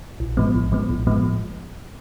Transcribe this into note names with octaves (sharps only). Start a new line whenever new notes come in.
A#1
A2 F3 G#3 B3
A#1
A2 F3 G#3 B3
A#1
A2 F3 G#3 B3